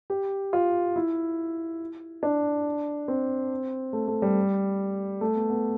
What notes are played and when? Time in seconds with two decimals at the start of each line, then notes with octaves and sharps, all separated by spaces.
0.10 G4
0.53 F4
0.96 E4
2.23 D4
3.08 C4
3.93 A3
4.08 A3
4.22 G3
5.21 A3
5.35 B3
5.50 B3